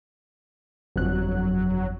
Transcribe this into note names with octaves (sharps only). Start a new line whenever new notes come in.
G1 F2 F#3 F#6